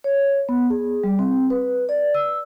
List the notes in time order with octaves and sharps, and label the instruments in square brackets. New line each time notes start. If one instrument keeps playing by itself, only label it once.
[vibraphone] C#5
B3
G#4
G3
C4
B4
D5
E6